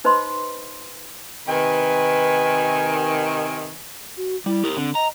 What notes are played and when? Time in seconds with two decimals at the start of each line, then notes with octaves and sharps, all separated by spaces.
0.04 D#4 B4 C5 D#5 B5 C6
1.48 C3 D#3 B4 G#5
4.17 F#4
4.46 G3 E4
4.64 G4 A#4
4.77 D3 C4
4.95 D#5 A#5